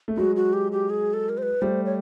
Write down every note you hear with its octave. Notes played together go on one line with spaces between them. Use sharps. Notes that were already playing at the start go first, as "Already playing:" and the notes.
A3
F#3 G#3 F#4
F#4
G4
G4
G#4
A4
A#4
C5
B4
G3 A3 C5
C#5